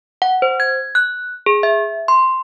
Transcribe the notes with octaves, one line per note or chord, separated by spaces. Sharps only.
F#5
C5
G#6
F#6
G#4
E5
C6